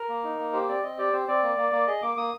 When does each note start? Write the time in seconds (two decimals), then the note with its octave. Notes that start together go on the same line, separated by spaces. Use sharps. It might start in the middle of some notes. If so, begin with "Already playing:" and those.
Already playing: A#4
0.09 A#3
0.24 D#4
0.39 A#3
0.53 G4 C5
0.68 C4 D5
0.83 C4 D#5
0.98 G4 D5
1.13 C4 C5
1.28 C4 D5
1.43 A#3
1.57 A#3
1.72 A#3
1.87 G#4 D#5
2.02 A#3 D6
2.17 A#3 D#6